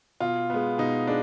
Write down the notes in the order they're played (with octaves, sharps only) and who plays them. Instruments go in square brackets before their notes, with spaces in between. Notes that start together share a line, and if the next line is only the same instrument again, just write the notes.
[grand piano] B2 F4
G#3 B3
B2 D#4
G#3 D4